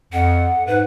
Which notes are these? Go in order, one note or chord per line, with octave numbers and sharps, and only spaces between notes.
F2 F#5
G#2 B4 F#5